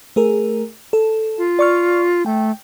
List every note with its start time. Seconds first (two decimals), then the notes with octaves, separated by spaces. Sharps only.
0.16 A3 G#4 A#4
0.93 A4
1.38 F4
1.59 D5 C#6 F6
2.26 A3 G5